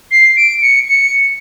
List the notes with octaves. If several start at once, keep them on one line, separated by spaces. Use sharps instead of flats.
C7
D7
C#7
C#7